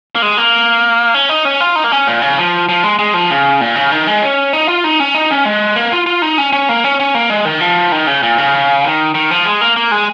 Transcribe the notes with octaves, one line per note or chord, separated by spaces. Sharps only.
A#3
G#3
A#3
C#4
D#4
C#4
F4
D#4
A#3
C#4
A#2
C#3
F3
F3
G#3
G#3
F3
C#3
A#2
C#3
D#3
G#3
C#4
D#4
F4
D#4
C#4
D#4
C#4
G#3
A#3
F4
F4
D#4
C#4
C#4
A#3
C#4
C#4
A#3
G#3
D#3
F3
D#3
C#3
A#2
C#3
D#3
D#3
F3
G#3
A#3
A#3
G#3